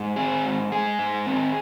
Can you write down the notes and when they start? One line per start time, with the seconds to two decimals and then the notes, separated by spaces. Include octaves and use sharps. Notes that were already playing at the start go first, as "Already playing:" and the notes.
Already playing: G#2
0.16 C4 G#4
0.45 G#2
0.72 G#3 G#4
0.99 G#2
1.27 C4